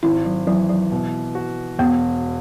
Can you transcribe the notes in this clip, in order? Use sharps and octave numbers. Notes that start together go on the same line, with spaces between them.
G#1 E4
F#3
E3 F#3
F#3
B2
F#4
E1 B3